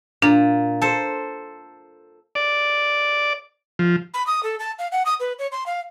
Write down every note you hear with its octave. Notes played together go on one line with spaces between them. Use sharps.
A#2 D4
A4 C5 A5
D5
F3
B5
D#6
A4
A5
F5
F#5
D#6
B4
C#5
C6
F5